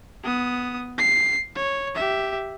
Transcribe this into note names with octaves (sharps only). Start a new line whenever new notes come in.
B3 D#6
C7
C#5
G4 E5